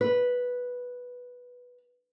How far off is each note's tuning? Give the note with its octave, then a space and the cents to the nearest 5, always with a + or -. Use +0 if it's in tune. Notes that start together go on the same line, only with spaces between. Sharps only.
B4 -5